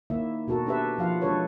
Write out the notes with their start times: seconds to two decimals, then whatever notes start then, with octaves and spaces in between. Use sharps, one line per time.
0.10 D#3 A#3 E4 E5
0.48 B2 F#4 A4 A#4
0.67 D4 G4 A4 B4 E5
0.98 F3 F4 F5 F#5
1.21 E3 G#3 D4 A4 B4 C#5